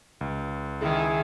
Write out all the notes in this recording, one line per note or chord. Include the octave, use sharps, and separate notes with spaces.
C#2
D#3 E4 G#4